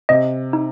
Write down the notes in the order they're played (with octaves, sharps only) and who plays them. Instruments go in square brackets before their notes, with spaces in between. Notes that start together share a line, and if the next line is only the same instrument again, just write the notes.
[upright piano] C3 [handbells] D#5
[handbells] D#4